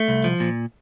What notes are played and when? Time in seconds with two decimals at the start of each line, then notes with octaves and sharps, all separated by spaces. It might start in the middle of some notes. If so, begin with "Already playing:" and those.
Already playing: A3
0.08 C2
0.24 F3
0.40 A#2